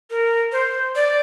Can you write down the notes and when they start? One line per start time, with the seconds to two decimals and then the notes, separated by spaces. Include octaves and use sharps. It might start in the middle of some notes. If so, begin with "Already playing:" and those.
0.10 A#4
0.52 C5
0.95 D5